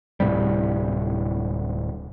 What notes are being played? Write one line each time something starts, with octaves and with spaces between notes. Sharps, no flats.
D1 A2 C3 G3